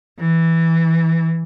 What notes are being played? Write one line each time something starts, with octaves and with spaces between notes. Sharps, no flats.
E3